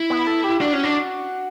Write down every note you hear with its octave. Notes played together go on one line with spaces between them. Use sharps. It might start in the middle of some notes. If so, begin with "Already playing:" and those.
Already playing: E4
B3
A4
G4
D4 F#4
C#4
D4